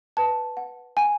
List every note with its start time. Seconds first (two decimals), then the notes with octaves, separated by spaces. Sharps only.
0.17 B4 A5
0.57 F#5
0.97 F#5 G#5